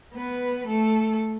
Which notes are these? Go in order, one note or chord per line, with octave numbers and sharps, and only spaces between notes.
B3 B4
A3 A4